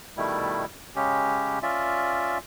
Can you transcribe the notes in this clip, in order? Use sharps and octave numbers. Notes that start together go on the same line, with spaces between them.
B2 D#3 G3 A3 E4
C#3 G#3 C#4 G4
C#4 F4 D5 E5